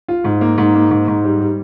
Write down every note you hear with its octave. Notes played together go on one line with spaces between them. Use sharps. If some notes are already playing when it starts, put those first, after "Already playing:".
F4
G#2
A#3
G#2
A#3
G#2
G#2
G3
G3